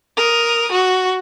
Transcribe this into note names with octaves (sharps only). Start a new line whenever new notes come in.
A#4 D#6
F#4